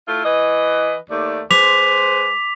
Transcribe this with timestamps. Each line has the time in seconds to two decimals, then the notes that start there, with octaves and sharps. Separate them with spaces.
0.08 A3 E4 F4
0.25 E3 B4 D#5
1.10 D#2 A3 D5
1.51 G#3 B4 C5 D6 B6 F7